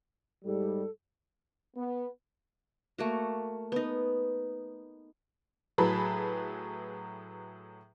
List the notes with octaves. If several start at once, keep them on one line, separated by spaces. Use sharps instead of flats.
G#2 G3 A4
B3
A3 A#3 F#4
B3 D#4
A2 F#3 G#4 B4 A5 B5